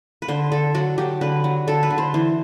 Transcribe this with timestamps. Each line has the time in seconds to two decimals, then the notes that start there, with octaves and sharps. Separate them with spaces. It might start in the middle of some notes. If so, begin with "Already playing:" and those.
0.22 B4
0.28 D3 C5
0.51 D3 A4
0.74 F#3 F#4
0.98 F#3 G4
1.21 D3 B4
1.44 F#3
1.67 D3 A4
1.83 B4
1.90 D3
1.98 C5
2.14 E3 C5